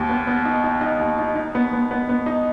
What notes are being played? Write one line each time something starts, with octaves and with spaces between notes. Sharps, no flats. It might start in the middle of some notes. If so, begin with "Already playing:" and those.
Already playing: D#2
B3
B3
D#4
D#4
D#4
D#2
D#4
D#4
B3
B3
B3
B3
D#4